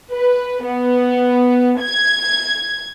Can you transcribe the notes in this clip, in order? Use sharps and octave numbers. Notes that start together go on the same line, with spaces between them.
B4
B3
G#6